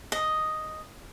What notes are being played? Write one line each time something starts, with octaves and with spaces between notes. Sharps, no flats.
D#5